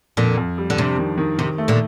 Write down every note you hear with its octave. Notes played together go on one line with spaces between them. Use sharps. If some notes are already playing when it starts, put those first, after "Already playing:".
F2 A#2 D3
F2
G3
D3
C3 D4
D#3
D#3
C3 D#3
A3
A#2 D3